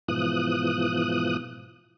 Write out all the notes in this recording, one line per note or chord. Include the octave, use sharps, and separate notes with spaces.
G#2 B2 E3 F3 D#6 F#6